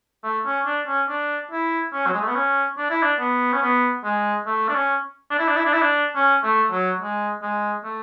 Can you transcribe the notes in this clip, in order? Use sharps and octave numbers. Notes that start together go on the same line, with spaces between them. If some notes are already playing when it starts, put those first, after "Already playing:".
A3
C#4
D4
C#4
D4
E4
C#4
F#3
G#3
A3
B3
C#4
D4
E4
D4
B3
C#4
B3
G#3
A3
D4
C#4
D4
E4
D4
E4
D4
E4
D4
C#4
A3
F#3
G#3
G#3
A3